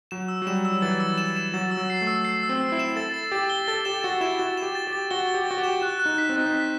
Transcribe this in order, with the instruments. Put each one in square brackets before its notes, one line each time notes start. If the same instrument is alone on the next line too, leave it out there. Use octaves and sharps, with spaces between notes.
[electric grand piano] F#3 [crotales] E7
[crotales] E6
[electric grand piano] F#3
[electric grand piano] G3 [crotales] E7
[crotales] E6
[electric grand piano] F#3
[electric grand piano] E3 [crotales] A6
[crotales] E6
E7
E7
[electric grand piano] F#3 [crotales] A6
[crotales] E6
[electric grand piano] F#3
[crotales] C7
[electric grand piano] A3
[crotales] E6
C7
E6
[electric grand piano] C4
[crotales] E6
[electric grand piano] E4
[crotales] E7
[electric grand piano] A4 [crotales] A6
[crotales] A6
[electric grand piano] G4 [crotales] A6
[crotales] G7
[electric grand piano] A4 [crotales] A6
[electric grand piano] G4 [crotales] E7
[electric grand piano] F#4 [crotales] A6
[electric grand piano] E4 [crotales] E7
[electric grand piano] F#4 [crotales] A6
[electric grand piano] G4 [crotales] E7
[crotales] A6
[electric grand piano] G4
[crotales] A6
[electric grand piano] F#4 [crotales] G7
[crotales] G7
[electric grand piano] G4
[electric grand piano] F#4 [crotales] A6
[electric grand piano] G4
[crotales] E7
[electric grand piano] F#4 [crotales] F#6
[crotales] F#6
[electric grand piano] D#4
[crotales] B6
[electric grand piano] C4
[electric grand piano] D#4 [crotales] F#6
[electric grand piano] C4
[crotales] B6